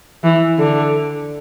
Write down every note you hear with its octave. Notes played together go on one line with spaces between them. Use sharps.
E3
D3